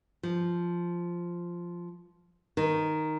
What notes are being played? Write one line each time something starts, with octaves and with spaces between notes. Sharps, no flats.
F3
D#3